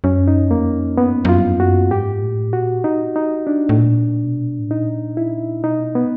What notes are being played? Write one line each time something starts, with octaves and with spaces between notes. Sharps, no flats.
F#2 C#4
D#4
F2 A#3
F#2 B3
G2
F#2 F4
G2
F#2
F#4
G#2 G4
A2
A#2 F#4
D#4
D#4
D4
A2
A#2
B2
A2
A#2 D#4
E4
B2 D#4
B3